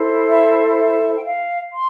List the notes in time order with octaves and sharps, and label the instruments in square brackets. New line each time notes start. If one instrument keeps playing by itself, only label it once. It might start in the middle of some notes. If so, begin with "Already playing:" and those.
Already playing: [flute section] E4 A4 C5
E5
E5
G5
F5
C6